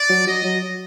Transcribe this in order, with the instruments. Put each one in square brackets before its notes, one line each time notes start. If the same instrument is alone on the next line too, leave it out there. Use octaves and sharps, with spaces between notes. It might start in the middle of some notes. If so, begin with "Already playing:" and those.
Already playing: [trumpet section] D5
[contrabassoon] F#3
[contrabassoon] F#3 [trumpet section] D#5
[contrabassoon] F#3